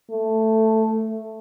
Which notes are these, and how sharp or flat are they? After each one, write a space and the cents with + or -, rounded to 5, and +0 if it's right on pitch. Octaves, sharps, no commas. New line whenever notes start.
A3 +5